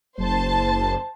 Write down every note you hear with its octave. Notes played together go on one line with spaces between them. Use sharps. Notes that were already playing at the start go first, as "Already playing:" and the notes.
F#1 C5 A5